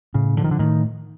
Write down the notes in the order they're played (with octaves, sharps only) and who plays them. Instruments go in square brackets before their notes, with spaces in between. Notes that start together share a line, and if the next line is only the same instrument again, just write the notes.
[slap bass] A2 [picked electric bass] C#3
[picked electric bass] D3 [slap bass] F3
[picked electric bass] D#3
D3
[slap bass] A2 [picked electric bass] D#3